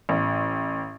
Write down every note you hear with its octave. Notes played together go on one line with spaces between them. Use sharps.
A1